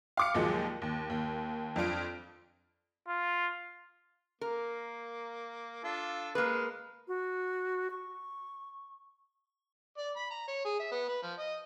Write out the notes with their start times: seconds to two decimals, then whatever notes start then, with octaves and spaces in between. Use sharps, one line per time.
0.17 F5 D6 C#7
0.34 D#2 A#2 F3 F#3 G#3
0.82 D#2
1.10 D#2
1.76 F2 D4 F4 D7
3.08 F4
4.41 A#3 A#4
5.84 D4 F4 A4
6.35 G#3 A#3 B4
7.08 F#4
7.91 C#6
9.98 D5
10.16 B5
10.30 A#5
10.48 C#5
10.65 G#4
10.79 E5
10.92 B3
11.08 B4
11.23 F3
11.38 D#5